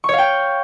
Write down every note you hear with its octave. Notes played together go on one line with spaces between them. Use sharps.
C#5 F5 G5 C#6